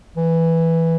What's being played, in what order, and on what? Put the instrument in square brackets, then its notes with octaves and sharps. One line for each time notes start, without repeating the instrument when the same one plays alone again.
[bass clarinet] E3